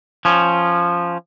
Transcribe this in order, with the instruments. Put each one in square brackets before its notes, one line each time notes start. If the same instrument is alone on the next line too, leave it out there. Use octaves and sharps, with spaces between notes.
[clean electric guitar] F3 C#4